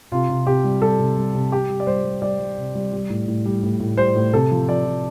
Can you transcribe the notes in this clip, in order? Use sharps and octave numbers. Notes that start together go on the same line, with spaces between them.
C3 F4
C3
C3 G4
G3
G3 A4
C3
G3
C3
G3 G4
G3
D5
G3 C5
G3
G3 D5
G3
C3
G3
G3
A2
A2
G3
A2
A2
G3 C5
A2
C3 A4
F3
F3 D5
F3